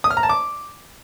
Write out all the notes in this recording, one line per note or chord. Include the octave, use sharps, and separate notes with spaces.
D#6
F6
A#5
A5
D6